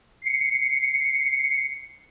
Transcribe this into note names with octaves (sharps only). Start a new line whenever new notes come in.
C7 C#7